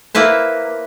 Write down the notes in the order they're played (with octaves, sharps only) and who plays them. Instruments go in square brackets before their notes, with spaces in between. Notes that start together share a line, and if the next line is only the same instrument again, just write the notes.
[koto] A#3 E4 B4 C5